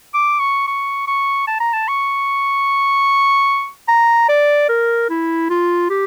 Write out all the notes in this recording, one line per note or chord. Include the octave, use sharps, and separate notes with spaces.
D6
C#6
C#6
C#6
A5
A#5
A5
C#6
A#5
D5
A#4
E4
F4
G4